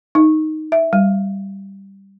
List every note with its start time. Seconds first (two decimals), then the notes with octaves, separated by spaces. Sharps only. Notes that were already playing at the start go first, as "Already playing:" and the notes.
0.15 D#4
0.72 E5
0.93 G3